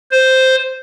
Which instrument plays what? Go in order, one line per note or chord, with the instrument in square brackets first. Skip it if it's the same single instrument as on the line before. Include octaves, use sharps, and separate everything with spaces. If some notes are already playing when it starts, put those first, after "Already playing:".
[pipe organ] C5